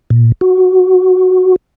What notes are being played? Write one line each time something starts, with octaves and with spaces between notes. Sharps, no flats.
A#2
F#4